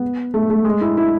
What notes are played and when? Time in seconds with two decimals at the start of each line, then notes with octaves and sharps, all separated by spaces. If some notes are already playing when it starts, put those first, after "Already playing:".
Already playing: B3
0.34 A3
0.50 A3
0.65 G#3
0.81 E4
0.97 E4